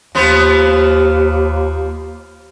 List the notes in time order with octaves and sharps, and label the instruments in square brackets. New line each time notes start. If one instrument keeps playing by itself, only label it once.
[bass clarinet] D#2 [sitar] F3 B3 C5